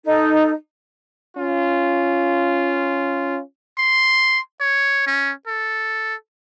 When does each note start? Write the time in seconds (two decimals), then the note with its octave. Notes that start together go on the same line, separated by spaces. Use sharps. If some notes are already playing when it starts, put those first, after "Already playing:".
0.05 D#4 A4
1.37 C#4 F4
3.78 C6
4.61 C#5
5.07 C#4
5.47 A4